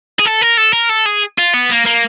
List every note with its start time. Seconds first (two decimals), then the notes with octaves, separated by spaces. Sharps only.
0.19 G#4
0.25 A4
0.41 A#4
0.57 A4
0.73 A#4
0.89 A4
1.06 G#4
1.38 F4
1.54 B3
1.70 A#3
1.85 A#3